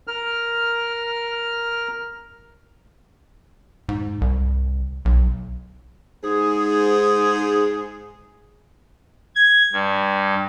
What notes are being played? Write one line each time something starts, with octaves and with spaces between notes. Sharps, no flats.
A#4 F6
G#2
C2
B1
G#2 G#4
G#6
G2